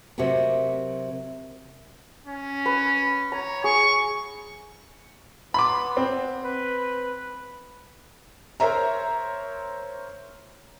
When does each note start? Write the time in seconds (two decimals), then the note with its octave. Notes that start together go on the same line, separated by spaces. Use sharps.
0.18 C3 F#3 F#4 G4 A#4
2.26 C#4
2.66 B4
3.32 C#5 A#5
3.64 G#4 C#6
5.54 B3 B5 C6 D6
5.97 C4
6.44 B4
8.60 A#4 C5 C#5 E5 A#5